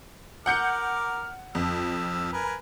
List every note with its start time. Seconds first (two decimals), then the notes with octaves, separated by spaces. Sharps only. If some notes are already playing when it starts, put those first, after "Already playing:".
0.46 A#4 F#5 D6 F6 G6 C#7
1.55 F2 F3 E6
2.33 A#4 B4 G#5